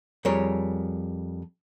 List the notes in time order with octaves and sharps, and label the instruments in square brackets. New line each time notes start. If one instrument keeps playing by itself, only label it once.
[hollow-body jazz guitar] F2 G3 G#4 A#4 C#5